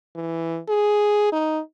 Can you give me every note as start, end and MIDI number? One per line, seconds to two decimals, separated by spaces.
0.16 0.59 52
0.69 1.29 68
1.32 1.60 63